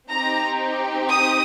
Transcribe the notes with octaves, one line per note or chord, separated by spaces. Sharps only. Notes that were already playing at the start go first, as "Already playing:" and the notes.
C4 D#4 G4 A#5
D#6